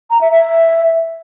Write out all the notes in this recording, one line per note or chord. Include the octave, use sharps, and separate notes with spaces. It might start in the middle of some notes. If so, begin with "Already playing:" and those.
A#5
E5
E5